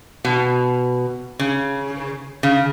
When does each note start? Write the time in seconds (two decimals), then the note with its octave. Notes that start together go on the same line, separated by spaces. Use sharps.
0.25 B2
1.39 C#3
2.43 C#3